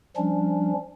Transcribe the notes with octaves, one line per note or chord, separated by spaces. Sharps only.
F3 G3 C#4 D4